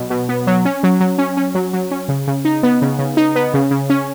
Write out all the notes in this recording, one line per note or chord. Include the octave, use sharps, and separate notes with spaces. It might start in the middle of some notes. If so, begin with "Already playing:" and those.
Already playing: B2 F#3
B2
B3
F#3
C#4
F#3
F#3
C#4
C#4
F#3
F#3
C#4
C#3
C#3
D#4
B3
C#3
C#3
D#4
B3
C#3
C#3
C#4